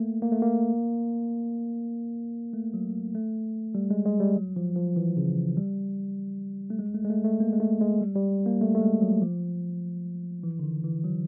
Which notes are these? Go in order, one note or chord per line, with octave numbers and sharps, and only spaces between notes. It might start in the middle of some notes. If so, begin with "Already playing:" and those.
Already playing: A3 A#3
A#3
A3
A#3
A3
F#3
A3
G3
G#3
G#3
G3
F#3
F3
F3
E3
C#3
G3
A3
G#3
A3
G#3
A3
A3
A#3
G#3
A3
G#3
G3
G3
A#3
A3
A3
G#3
F#3
F3
E3
D3
D#3
E3
F#3